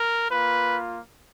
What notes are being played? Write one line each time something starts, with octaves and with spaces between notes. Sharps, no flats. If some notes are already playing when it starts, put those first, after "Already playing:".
Already playing: A#4
A#3 F4 B4